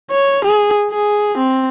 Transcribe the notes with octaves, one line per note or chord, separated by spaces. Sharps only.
C#5
G#4
G#4
C4